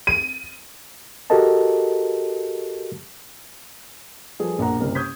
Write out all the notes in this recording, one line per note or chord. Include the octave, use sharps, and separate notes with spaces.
D#7
F#4 G4 A4 A#4 D#5 A5
F3 G3 G#4 A4 B4
A#1 B2 A#3 F#5 A#5
F#1 C2 G3 A#4
C#6 D#6 G6 G#6 B6